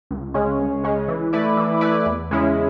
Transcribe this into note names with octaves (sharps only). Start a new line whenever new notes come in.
C#2
C#3 G#3 C#4
C#2
C#3 G#3 C#4
E3
A3 E4 B4 D5
E3
A3 E4 B4 D5
E2
C#3 G#3 C#4 E4